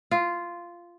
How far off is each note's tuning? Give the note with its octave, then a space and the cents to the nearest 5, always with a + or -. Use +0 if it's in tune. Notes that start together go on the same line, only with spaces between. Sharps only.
F4 -10